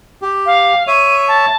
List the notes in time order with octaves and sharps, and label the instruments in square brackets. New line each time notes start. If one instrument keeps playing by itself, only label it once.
[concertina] G4
[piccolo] F5
[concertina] C#5 E5 [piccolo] D#7
[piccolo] A5